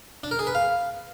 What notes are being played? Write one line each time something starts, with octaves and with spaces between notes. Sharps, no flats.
D4
A#4
G#4
B4
F5